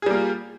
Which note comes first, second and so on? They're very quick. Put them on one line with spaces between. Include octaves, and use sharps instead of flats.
G#4 G3 A#3 F4